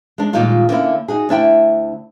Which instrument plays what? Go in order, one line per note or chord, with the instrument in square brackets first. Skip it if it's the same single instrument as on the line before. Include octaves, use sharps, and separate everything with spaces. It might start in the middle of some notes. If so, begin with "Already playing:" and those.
[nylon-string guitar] G#3 D4
A#2 D#3 G3 G#3 D#4 F4
D3 A#3 C#4 E4
D#4 F#4 G#4
D2 D4 E4 G5